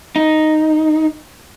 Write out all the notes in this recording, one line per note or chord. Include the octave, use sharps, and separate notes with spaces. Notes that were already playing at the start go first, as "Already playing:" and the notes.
D#4